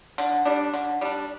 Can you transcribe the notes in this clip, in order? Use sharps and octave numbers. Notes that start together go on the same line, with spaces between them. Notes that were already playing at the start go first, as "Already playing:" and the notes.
D3
G3 D4
D3
G3 D4